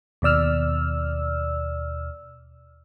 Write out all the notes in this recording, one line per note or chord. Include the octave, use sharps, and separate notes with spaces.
D#2 B2 D5 E6 F6